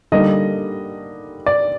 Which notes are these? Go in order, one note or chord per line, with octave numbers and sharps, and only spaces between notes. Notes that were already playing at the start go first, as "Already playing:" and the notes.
D3 G3 A#3 D#4 D#5
D5